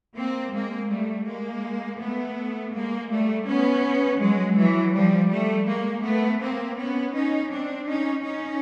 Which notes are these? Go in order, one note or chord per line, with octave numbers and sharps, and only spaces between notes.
A#3 C4
G#3 A#3
G3 A3
G#3 A#3
A3 B3
G#3 A#3
G3 A3
B3 C#4
F#3 G#3
E3 F#3
F3 G3
G3 A3
G#3 A#3
A3 B3
A#3 C4
B3 C#4
C#4 D#4
C4 D4
C#4 D#4
C#4 D#4